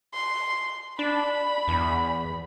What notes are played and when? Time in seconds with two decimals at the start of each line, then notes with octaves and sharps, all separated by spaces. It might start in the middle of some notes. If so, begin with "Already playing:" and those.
0.14 C6
0.99 D4 B5
1.68 E2